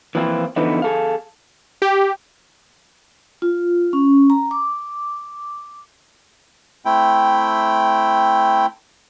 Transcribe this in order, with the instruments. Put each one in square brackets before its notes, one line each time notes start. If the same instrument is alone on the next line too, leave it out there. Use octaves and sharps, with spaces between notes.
[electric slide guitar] E3 F3 A#3 C4 E4 F4
D3 E3 F3 B3 D#4 E4
G#4 A4 F5
[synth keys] G4
[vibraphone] F4
C#4
A#5
D6
[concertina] A3 C4 E4 G5